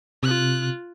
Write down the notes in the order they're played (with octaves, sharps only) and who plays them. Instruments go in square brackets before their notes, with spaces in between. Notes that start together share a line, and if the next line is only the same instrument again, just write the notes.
[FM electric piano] C3 [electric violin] F4 F#6